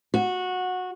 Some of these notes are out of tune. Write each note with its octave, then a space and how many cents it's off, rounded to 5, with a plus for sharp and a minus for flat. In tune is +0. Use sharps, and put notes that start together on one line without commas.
F#4 -15